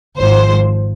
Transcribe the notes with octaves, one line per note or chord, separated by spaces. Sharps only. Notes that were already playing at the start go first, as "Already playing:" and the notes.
G#1 G#2 F3 C5